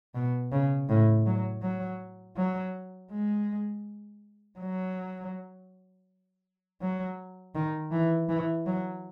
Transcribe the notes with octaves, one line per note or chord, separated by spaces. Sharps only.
B2
C#3
A2
F#3
F#3
F#3
G#3
F#3
F#3
D#3
E3
E3
F#3